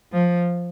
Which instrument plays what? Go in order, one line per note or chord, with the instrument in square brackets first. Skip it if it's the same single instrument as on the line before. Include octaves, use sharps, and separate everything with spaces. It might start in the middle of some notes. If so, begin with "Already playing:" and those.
[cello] F3